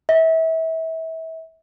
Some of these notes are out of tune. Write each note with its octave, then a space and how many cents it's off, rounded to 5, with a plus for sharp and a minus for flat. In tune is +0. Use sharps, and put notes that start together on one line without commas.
E5 -30